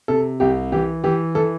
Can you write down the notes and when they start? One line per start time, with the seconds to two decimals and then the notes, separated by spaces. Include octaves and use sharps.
0.08 C3 A4
0.40 C2 G4
0.72 E3 G4
1.04 E3 G4
1.35 E3 A4